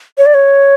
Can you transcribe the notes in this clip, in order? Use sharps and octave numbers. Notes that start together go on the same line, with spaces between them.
C#5
D5
C#5